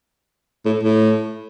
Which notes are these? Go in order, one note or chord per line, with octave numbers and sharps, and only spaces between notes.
A2
A2